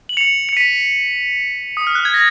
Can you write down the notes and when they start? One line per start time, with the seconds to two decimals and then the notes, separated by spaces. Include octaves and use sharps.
0.09 F#7
0.17 C#7 F7
0.49 C#7
0.57 B6 D#7
1.77 D#6
1.87 F6
1.95 F#6
2.05 G#6
2.14 A#6